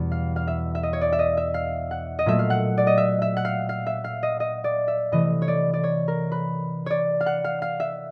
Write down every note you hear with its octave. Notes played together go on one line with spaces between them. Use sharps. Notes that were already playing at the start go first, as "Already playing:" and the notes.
Already playing: E2 B2 G3 B3
F5
F5
E5
E5
D#5
C#5
D5
E5
D#5
E5
F5
F#5
D#5
A#2 F#3 A3 E5
F5
F#5
D5
D#5
E5
E5
F#5
F5
F5
E5
F5
D#5
D#5
D5
E5
C3 E3 A3 D#5
C#5
D5
D5
C#5
A#4
B4
C#5 D5
F5
F#5
F5
F5
E5